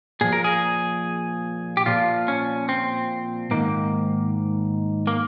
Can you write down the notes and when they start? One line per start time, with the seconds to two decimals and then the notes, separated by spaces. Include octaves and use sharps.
0.21 A#2 F3 G#4
0.33 A#4
0.44 G#4
1.77 G4
1.86 A#2 F3 F4
2.28 C#4
2.69 C4
3.51 G#2 D#3 A#3
5.07 A#3